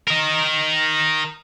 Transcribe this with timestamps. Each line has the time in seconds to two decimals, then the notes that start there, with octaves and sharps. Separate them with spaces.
0.08 A#4 D#5